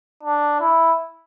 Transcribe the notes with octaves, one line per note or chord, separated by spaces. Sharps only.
D4
E4